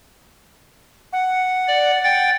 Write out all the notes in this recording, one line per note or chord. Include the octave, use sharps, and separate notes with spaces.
F#5
D5
G5 A6